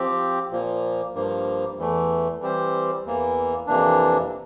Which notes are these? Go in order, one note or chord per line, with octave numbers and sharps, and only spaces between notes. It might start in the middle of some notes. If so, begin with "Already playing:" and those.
Already playing: F3 C4 G4
A#2 F3 A#3
G2 F3 A#3
E2 E3 A3
E3 G3 C4 G4 C5
E2 E3 A#3
F2 C3 E3 A#3 D4